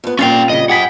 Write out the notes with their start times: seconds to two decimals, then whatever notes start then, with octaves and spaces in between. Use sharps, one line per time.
0.04 F2 B3
0.19 F2 A#2 G3 C#4 F4 F5 G5
0.50 A2 C#3 D#5
0.70 G4 G#4 F#5 G#5 B5